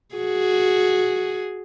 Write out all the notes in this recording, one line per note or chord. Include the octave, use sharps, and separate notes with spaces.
F#4 G#4